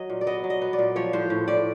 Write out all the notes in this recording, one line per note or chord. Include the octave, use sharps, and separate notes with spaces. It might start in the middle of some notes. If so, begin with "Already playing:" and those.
Already playing: F#3 D#5
A#2
D5
B3 D#5
F#3
D#5
B3
D5
A#2
F3 C#5
A2 C5
A2
A2 D5